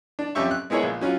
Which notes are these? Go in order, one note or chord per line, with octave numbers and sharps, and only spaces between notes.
D4
F2 C#4 G4 E5 C#6
F#6
G#3 B3 E4 G#4 A#4 C#5
A#1
F#3 C#4 F4